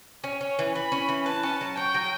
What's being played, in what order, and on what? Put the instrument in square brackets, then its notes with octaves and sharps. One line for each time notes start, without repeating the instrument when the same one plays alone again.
[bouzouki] C#4 [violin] C#5
[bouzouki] C#4
E3
[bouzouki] E3 [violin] B5
[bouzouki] C#4
E3
[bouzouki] B4 [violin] A5
[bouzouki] C#4
F#3
[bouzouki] C#4 [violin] G5
[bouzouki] F#3